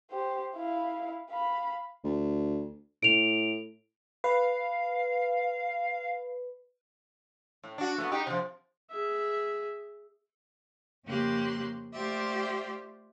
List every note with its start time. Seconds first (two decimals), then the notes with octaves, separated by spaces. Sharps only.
0.11 G4 C5
0.55 E4 F5
1.30 F5 B5
2.04 D2
3.02 A2 D7 F7
4.24 B4 F5
7.63 A2
7.78 D4 F#4
7.98 A3 B3 F#4
8.12 D#4 G4
8.27 C3 F3
8.90 G#4 E5
11.05 F2 C#3 A#3 G4 C6 F#6
11.93 A3 F4 G4 C5 D5 E5